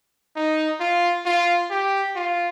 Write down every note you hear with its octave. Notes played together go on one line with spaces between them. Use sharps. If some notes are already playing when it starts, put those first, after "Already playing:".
D#4
F4
F4
G4
F4